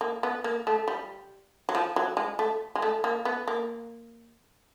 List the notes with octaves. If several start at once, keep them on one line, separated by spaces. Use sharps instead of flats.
A#3
B3
A#3
A3
G3
F#3
F3
F#3
G#3
A3
G#3
A3
A#3
B3
A#3